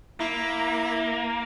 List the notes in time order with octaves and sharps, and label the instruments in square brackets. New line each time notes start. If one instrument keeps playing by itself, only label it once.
[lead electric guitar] A#3 [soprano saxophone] E4